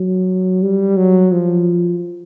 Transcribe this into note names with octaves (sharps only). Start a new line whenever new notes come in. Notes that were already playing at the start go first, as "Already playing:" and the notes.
Already playing: F#3
G3
F#3
F3